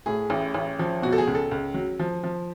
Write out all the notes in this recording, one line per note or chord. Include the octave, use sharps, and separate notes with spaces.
A2 G#4
A1
A1
F3
B2 F#4
A4
G#4
C#2
A4
C#2
F#3
F3
F3